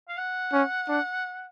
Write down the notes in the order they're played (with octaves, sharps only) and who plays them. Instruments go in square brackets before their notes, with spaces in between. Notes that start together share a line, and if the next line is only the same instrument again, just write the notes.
[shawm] F5
F#5
[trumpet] C#4
D4